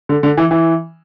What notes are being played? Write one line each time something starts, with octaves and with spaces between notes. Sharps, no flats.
D3
D3
E3
E3